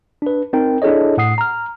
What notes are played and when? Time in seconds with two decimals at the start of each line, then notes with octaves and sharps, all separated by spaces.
0.22 D4 B4
0.53 C4 D#4 A#4 G5
0.82 D4 E4 G#4 A4 C#5 D#5
1.17 A2 F#5 D#6 C7
1.38 A#5 F6